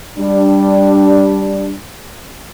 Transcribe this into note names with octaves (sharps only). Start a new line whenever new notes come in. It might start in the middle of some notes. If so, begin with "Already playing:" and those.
G3 D4